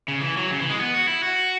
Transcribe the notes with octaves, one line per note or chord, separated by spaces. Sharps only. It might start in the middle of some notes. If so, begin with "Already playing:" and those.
C#3
E3
F#3
C#3
E3
G#3
B3
F#4
E4
F#4